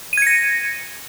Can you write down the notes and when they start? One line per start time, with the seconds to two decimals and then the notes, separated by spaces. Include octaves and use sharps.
0.13 D#7
0.17 G#6
0.22 C#7
0.27 A#6